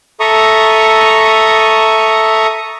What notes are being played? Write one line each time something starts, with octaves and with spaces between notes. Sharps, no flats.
A4 E5 A#5 C#6 D#6